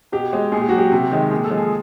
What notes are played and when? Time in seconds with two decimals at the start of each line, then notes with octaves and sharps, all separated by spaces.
0.12 B2 G4
0.33 G#3
0.52 A#2 G#4
0.61 G4
0.69 F#3 F#4
0.78 G4
0.92 C3
1.12 D#3 G#3
1.31 A#2 G#4
1.44 A4
1.51 F3 G#3
1.57 G#4